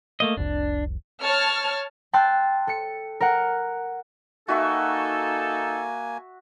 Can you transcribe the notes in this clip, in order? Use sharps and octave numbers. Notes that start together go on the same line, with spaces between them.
A3 A#3 D#5
F1 C2 D4
C#5 A5 F6
G5 A5 C6 E6 F#6 A6
A4 C#7
A#4 F#5
A#3 D#4 F#4 A4 E5 G#5 C#6